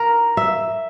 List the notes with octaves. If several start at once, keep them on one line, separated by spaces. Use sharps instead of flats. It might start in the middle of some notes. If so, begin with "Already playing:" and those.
Already playing: A#4
E5